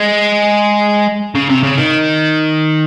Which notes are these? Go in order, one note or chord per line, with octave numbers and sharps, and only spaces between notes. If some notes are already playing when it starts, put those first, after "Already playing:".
Already playing: G#3
C#3
C3
C#3
D#3